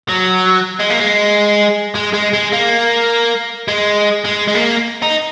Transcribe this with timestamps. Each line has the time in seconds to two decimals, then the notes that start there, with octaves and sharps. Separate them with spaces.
0.08 F#3
0.80 G#3
0.90 A#3
1.00 G#3
1.95 G#3
2.14 G#3
2.34 G#3
2.53 A#3
3.68 G#3
4.25 G#3
4.48 G#3
4.55 A#3
5.02 D#4